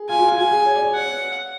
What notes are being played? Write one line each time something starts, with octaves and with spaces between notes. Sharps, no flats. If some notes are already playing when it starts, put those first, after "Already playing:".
Already playing: G#4
F4 G#5
F#4
F4
F#4 G#5
G#4
C#5
D5
C#5
F#5